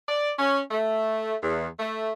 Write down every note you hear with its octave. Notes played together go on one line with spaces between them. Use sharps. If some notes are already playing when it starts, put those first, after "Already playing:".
D5
C#4
A3
E2
A3